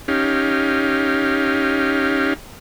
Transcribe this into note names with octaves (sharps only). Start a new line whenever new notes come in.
C#4 D#4 G4 F5